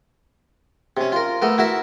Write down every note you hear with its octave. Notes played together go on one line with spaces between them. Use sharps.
C3 C#4
F4 A#4
A3 B3 A#4
E4 F#4 A#4 E5